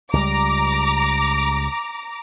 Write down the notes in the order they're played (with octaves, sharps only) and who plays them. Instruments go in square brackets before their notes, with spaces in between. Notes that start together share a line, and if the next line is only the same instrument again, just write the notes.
[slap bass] C#2 G3 [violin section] A#5 D6